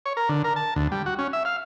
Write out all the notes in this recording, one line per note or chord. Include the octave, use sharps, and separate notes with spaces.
C#5
A#4
D3
A#4
A5
D2
G3
F#4
C#4
E5
F5